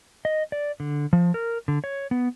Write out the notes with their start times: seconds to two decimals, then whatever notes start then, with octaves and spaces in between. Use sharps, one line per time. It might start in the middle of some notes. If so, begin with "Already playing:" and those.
0.25 D#5
0.52 D5
0.80 D3
1.13 F3
1.34 A#4
1.68 D3
1.84 C#5
2.11 B3